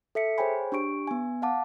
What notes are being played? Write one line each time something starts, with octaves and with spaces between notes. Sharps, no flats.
A4 E5 B6 C#7
G#4 C5 C#5 G5 G#5 B5
D4 G4 C#6 D7
B3 G#5
F5 F#5 A5 D6